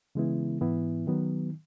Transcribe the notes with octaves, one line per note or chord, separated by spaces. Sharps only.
C#3 E3 G#3 B3 E4
G#2 E3 B3 E4
D#3 F#3 B3